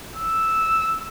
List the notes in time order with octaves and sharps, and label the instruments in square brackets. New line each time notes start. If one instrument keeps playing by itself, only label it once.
[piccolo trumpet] E6